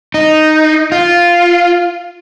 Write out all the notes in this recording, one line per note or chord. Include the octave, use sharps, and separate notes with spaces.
D#4
F4